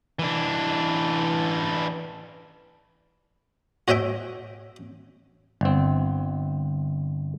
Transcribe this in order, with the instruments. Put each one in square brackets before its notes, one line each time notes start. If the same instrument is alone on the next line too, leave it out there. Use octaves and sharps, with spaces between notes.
[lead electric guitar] E3 D4
[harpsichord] F#4 C#5 D#5 E5 G5
[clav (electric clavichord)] G1 C4